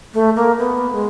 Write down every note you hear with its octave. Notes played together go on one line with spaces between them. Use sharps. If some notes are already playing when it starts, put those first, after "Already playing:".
A3
A#3
B3
G#3